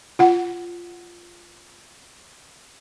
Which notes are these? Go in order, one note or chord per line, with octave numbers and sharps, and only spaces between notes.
F4 F#5